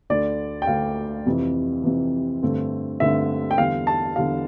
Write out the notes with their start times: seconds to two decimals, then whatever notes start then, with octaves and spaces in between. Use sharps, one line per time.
0.10 D2 D3 A3 D5
0.62 G5
0.67 D2 D3 A3 F5
1.26 F2 C3 E3
1.84 F2 C3 E3
2.43 G2 D3 A3 C4
3.00 G2 D3 A3 C4 E5
3.51 G5
3.58 E2 D3 G3 F5
3.87 A5
4.16 E2 D3 G3 F5